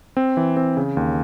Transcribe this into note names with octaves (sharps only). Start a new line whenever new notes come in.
C4
E3
C4
C#3
D#2